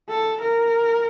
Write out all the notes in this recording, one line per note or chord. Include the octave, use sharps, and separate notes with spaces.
A4
A#4